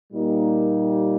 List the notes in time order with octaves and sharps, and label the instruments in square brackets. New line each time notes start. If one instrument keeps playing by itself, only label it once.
[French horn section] A#2 G3 A#3 D#4 G4